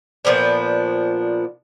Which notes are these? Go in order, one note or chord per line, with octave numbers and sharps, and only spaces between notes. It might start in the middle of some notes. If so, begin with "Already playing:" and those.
A#2 F3 B3 D4